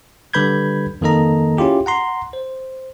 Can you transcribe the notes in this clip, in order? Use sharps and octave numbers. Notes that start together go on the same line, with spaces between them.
D3 G3 B4 B5 G6 G#6
F2 D#3 A#3 A4 D#5 A#5
C#4 E4 F4 G4 G#4
F#5 A#5 C6
C5